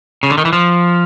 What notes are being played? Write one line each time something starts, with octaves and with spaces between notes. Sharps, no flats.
C#3
D3
D#3
E3
F3